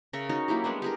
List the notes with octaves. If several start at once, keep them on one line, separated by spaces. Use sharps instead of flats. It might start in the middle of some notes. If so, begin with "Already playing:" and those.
C#3 A#4 E5 C#6
C#4 D#4 F#4 C#5
F#3 A#3 E4 G4
G3 G#3 B3 D4
G4 G#4 A#4